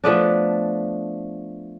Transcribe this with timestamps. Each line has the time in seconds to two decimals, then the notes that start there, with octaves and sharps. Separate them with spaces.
0.04 F3 A3 B3 D4